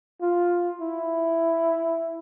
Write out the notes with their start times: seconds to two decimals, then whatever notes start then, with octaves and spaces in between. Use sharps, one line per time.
0.21 F4
0.81 E4